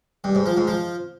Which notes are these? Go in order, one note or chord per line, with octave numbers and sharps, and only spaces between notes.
G2
G#2
F3
G#2
F3